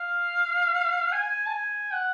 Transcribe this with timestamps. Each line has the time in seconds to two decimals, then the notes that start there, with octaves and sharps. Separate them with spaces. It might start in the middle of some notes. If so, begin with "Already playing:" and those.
Already playing: F5
1.12 G#5
1.46 A5
1.52 G#5
1.93 F#5